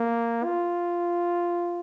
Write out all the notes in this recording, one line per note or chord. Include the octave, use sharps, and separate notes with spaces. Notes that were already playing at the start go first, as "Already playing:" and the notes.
Already playing: A#3
F4